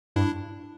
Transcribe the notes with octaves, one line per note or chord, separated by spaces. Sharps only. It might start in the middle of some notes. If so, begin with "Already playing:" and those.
G2 D4 E4